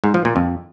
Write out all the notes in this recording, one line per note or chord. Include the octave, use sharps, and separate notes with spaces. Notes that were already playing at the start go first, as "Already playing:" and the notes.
G#2
F3
A#2
F2